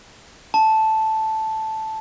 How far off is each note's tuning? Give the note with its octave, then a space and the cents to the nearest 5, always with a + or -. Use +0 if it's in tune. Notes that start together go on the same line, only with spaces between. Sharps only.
A5 -5